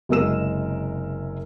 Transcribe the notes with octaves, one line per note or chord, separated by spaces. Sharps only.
F#1 C3 G#3 A#4 E6 E7